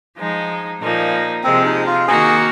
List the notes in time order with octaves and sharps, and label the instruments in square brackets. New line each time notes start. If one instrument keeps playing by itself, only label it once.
[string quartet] F3 G#3 D#4
A#2 F3 A#3 D#4
[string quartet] C3 F3 G#3 [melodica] C4
[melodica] D#4
F4
[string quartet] D#3 A#3 D#4 F#4 [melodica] G#4